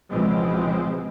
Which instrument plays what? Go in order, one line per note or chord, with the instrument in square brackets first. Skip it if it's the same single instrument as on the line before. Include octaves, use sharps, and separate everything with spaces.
[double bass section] C#2 B2 E3 F3 G#3 C4